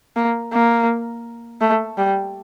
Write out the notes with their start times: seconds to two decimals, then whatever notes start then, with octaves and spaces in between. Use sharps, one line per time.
0.16 A#3
0.53 A#3
1.61 A3
1.98 G3